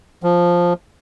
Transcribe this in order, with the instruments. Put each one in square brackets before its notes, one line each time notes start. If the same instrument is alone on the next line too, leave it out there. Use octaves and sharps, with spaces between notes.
[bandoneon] F3